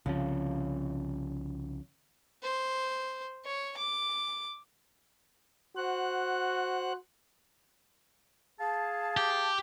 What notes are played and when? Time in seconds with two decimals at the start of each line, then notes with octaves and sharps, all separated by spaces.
0.06 C2 C#3 F3
2.43 C5
3.45 C#5
3.77 D6
5.77 F#4 C5 F#5 F#6
8.60 G#4 F5 A5
9.17 G4